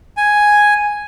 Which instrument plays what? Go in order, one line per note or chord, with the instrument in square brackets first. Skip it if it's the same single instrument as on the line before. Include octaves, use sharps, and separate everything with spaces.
[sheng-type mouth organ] G#5